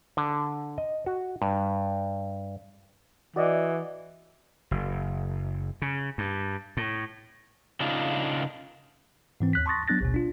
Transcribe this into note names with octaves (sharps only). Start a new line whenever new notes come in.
D3
D#5
F#4
G2
E3 F#4 D5 D#5
F#1
C#3
G2
A2
C#3 D4 D#4 F4
G#2 E3 C4
D#2 F#6 B6
A5 C6 C#6 D#6 A6 A#6
F#3 B3 D4 F#6 A6 A#6
A1 D2 B2
D4 F4